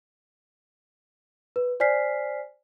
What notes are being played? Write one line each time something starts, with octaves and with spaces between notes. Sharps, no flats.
B4
C5 D5 G#5 F6 B6 C7